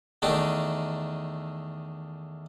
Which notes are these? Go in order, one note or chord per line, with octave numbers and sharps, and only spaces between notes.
E2 D#3 A3 D4 D#4 D6